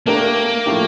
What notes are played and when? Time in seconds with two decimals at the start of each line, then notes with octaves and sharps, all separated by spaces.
0.06 A3 A#3 D4 G4 A#4
0.66 A2 F3 A3 E4 G4